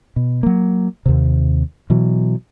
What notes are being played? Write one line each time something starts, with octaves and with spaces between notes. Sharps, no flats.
B2
F#3 A#3
D#2 C3
B2 E3 F#3